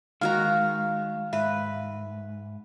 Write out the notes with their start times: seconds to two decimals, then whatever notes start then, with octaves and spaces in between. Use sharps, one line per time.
0.21 D#3 G#3 F#4 F5 A#5 F6
1.33 G#2 B4 E5